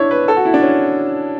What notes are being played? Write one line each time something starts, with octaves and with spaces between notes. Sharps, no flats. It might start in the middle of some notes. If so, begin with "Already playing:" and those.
Already playing: D4 E4 C#5
B4
A4
F#4
E4
D4
C#4